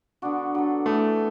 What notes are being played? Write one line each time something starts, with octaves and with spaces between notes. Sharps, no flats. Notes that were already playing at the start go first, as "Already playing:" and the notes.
D3 B3 D4 F#4
D3 F#3 D4 A4
E3 A3 B3 E4 A4